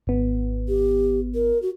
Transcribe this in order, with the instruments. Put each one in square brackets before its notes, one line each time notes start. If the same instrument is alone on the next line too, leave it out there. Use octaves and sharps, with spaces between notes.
[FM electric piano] G#1 B3
[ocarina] G4
A#4
F#4